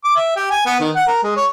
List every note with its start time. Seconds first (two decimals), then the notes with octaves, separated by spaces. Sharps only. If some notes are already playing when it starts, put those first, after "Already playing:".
0.04 D6
0.16 E5
0.36 G4
0.51 G#5
0.66 B3
0.80 D#3
0.95 F#5
1.07 A#4
1.23 G#3
1.37 C#5